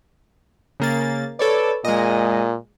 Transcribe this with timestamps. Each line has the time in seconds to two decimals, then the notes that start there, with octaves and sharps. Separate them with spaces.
0.80 C#3 A#3 A6
1.39 A4 B4 C#5 D5
1.85 A#2 G#3 D#5